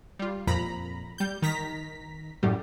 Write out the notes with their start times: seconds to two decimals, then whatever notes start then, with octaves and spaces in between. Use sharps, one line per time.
0.19 G3 F4
0.47 F2 A#2 A#5 B5
1.18 G3 G6
1.42 D#3 A#5 B6
2.43 F#2 A2 F#3 G3